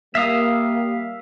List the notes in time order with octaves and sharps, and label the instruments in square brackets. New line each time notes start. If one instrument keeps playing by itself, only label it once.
[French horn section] G3 A#3 [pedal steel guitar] E5 F5 D#6